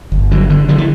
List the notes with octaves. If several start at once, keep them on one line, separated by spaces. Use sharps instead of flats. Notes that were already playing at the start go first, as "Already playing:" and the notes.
G1
D3 F#3
D3
D3 F3
E3